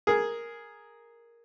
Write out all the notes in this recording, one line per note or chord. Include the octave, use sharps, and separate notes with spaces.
G#4 A#4